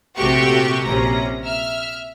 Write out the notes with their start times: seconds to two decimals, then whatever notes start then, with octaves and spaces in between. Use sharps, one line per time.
0.17 A#1 C3 A3 F#4 G4 C#6
0.85 A#1 C3 C#4 A#5
1.44 E5 F6